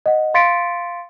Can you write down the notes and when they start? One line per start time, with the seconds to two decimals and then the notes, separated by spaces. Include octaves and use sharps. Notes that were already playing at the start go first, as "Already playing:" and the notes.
0.06 D#5 F#5
0.34 F5 C6 A6 B6 C#7 D7